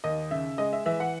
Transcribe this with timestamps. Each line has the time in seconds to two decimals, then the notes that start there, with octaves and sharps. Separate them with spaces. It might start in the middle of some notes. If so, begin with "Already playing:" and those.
0.04 D#2 D#5
0.31 C#3 E5
0.58 G#3 D#5
0.73 E5
0.86 E3 E5
1.00 F#5